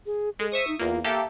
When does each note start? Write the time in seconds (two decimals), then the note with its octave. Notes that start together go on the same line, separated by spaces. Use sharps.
0.06 G#4
0.39 G#3 A4
0.52 C5 E5 C#6 D#6
0.68 D#4
0.79 E2 A#3 F4
1.04 A#3 G4 A4 E5